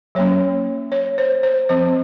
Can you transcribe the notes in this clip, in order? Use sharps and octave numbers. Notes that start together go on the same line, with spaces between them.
F#3 A#3 C#4 C#5
C#5
C5
C5
F3 C4 C5